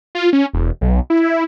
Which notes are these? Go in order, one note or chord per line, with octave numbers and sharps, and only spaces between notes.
F4
C#4
E1
B1
E4